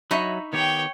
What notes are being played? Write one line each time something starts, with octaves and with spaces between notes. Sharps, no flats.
F#3 D#4 D#5 E5 A#5 B5 C#6
D#3 B3 G4 C#5 G5